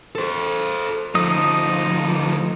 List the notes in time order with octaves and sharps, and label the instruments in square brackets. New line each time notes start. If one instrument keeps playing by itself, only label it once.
[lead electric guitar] A4 C5
[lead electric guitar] D2 F3 [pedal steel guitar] D#4 D#6